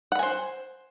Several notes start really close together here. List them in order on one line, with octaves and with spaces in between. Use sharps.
F#5 B5 G#5 C5